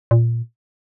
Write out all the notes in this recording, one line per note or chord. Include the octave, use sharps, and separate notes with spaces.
A#2